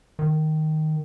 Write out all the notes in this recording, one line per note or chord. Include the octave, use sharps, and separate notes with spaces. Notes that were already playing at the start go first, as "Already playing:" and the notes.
D#3